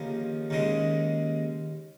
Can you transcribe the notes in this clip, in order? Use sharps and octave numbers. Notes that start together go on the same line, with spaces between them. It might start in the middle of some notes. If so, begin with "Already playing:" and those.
Already playing: D#2 C#3 F3 A#3 F4
D#2 C#3 G#3